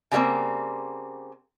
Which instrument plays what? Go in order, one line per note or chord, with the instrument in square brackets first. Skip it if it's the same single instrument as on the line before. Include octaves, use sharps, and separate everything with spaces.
[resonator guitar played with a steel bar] C#3 G3 G#3 A#3 C4